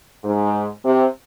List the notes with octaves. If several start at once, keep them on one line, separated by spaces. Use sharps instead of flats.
G#2
C3